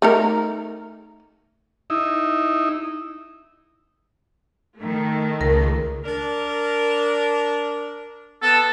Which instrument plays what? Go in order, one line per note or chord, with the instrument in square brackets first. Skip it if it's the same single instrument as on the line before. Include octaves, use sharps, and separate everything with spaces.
[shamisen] A3 D#4 A#4
[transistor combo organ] D#4 E4
[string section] D#3 A3
[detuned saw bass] C#2 [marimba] A#4
[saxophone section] D4 A#4
[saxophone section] B3 [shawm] A4